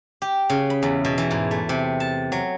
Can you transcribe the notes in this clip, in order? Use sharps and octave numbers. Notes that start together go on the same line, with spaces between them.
G4
C#3
B5
E2
B2
E3
G#2
A3
C3
A5
F#3